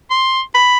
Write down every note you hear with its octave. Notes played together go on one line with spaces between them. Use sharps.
C6
B5